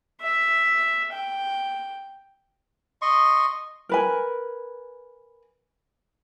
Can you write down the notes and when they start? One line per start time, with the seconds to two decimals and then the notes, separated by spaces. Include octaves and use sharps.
0.21 E5
1.13 G5
3.02 D#5 C6 C#6
3.89 A#4 B4 G#5